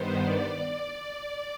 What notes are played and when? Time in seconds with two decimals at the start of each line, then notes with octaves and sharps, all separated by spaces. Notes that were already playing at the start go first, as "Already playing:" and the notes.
Already playing: G2 D#3 B3 C5
0.24 D5